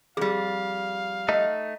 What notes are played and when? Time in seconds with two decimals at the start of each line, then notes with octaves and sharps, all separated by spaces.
0.17 F2 G3 G#4 F5
1.29 A3 D#4 D#5